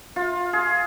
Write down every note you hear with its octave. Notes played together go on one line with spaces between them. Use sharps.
F4
G#4